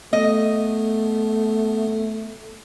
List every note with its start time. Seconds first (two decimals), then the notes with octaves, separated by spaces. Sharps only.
0.13 A3 B3 D#5